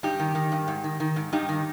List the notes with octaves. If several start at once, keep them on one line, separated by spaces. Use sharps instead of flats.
G2 D#4 G4
D#3
D#3
G2
G#2
D#3
D#3
G#2
G2 D#4 G4
D#3